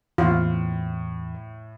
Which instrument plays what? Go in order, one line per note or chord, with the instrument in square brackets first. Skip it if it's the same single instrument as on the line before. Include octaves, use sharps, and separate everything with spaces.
[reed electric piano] E2 [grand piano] A2 [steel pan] F4